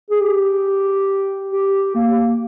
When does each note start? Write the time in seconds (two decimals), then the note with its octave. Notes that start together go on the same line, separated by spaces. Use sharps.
0.10 G#4
0.21 G4
1.51 G4
1.95 A#3